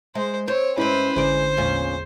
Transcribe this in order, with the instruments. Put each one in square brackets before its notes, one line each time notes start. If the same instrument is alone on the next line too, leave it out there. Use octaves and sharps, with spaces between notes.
[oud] G#3 [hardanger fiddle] C5
[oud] C4 C5 [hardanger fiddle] C#5
[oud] G#2 C4 [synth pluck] C#4 E4 [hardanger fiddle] B4 C5
[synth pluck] A1 D3 [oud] G#3 D5 [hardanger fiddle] C5
[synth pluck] E2 G#3 [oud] A#2 B3 C#4